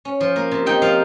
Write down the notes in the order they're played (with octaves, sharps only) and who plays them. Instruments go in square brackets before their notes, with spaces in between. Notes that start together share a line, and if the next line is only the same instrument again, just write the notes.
[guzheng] C#4
F3
A#3
C3
D#4 G5
F3 F5